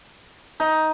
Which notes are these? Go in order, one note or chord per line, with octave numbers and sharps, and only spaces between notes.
D#4